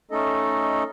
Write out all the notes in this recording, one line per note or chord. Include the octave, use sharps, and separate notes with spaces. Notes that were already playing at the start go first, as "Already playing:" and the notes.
A3 C#4 D#4 A4 D#5